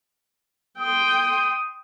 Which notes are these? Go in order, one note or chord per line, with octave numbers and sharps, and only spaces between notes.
G5 C6 D#6